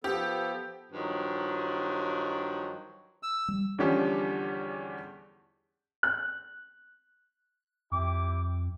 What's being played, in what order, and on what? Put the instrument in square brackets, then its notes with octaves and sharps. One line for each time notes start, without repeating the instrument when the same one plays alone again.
[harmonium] F3 B3 A4 [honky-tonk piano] G4
[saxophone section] G2 D#3 F3 F#3
[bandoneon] E6
[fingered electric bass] G3
[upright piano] E2 D3 F3 G3 C#4 G4
[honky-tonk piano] F#6
[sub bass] F2 [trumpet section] E4 G4 D6